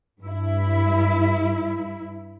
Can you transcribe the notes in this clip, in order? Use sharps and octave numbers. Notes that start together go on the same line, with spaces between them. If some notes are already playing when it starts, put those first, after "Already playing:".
G2 E4